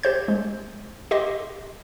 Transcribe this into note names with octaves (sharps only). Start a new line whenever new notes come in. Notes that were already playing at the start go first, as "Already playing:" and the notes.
G4 C5 G6
G#3
G4 D#5 C6